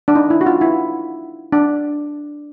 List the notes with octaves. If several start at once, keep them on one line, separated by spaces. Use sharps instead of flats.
D4
D#4
E4
F#4
F4
E4
D4